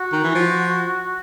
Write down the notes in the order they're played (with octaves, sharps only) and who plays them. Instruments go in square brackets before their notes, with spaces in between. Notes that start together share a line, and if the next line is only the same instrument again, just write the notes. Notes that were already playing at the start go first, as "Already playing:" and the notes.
Already playing: [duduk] F#4
[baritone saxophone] D#3
E3
F3